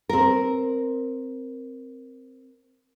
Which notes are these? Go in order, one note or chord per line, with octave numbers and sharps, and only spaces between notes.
C4 A#4